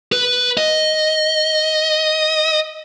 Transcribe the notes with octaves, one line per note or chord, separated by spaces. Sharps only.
B4
D#5